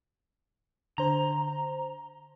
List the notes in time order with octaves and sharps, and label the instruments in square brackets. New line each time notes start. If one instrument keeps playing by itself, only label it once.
[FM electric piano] D3 C5 [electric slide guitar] A#5